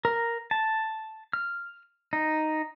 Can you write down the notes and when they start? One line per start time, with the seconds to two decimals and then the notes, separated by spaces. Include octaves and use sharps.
0.05 A#4
0.51 A5
1.33 F6
2.13 D#4